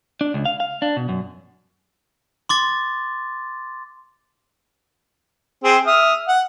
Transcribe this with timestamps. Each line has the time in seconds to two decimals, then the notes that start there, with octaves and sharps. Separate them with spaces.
0.21 D4
0.34 C#2
0.45 F5
0.60 F5
0.82 D4
0.97 B2
1.09 F#2
2.49 C6 D6 A6
5.64 C4 G#4
5.87 E5 D#6 F6
6.29 F#5